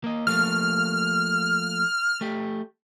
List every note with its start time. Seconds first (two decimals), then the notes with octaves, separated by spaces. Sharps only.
0.04 A#3 D#5
0.27 F3 A3 A#3 F6
2.21 A3 G4